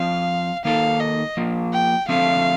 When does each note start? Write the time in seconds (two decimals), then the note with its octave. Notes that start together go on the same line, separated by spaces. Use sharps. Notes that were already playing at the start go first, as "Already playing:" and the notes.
Already playing: F3 C4 F4 F5
0.65 D#3 A#3 D#4 A4 F5
1.00 D#5
1.37 F3 A#3 F4
1.73 G5
2.08 D3 F3 A3 C4 F5